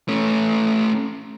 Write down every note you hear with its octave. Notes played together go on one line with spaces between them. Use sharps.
A3 C#4